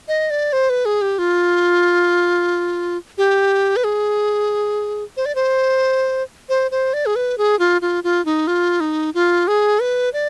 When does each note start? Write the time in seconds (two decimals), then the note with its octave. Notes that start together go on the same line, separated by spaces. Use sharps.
0.08 D#5
0.30 D5
0.53 C5
0.70 B4
0.85 G#4
1.02 G4
1.19 F4
3.18 G4
3.76 B4
3.84 G#4
5.17 C5
5.26 D5
5.35 C5
6.49 C5
6.71 C5
6.94 D5
7.06 G#4
7.16 B4
7.38 G#4
7.59 F4
7.82 F4
8.04 F4
8.25 D#4
8.47 F4
8.80 D#4
9.14 F4
9.48 G#4
9.80 B4
10.13 D5